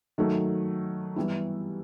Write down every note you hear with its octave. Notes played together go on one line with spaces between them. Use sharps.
D#3 F#3 A3
E3 G3 B3 E4